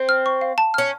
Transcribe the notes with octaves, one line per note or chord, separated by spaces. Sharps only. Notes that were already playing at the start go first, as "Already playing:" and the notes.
Already playing: C4
F6
C#6
F5
A5
C#4 F6